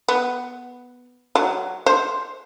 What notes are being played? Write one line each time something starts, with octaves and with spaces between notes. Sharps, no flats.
B3
F#3
C5